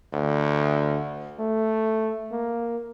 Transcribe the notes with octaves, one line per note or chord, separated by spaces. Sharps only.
D2
A3
A#3